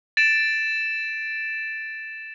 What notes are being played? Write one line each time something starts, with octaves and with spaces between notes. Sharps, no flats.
A6 D7 E7